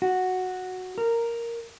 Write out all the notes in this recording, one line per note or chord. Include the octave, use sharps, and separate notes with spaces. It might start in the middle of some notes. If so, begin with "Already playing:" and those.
F#4
A#4